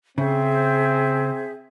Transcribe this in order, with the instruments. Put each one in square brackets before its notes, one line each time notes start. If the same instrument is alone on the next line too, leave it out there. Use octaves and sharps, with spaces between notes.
[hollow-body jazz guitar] C#3 [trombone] C4 [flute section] G#4 C5 E5